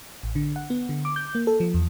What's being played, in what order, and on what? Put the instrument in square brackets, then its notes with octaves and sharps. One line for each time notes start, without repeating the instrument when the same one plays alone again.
[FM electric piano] A1
D3
F#5
B3
D3
D6
G6
A#3
A4
F3
E2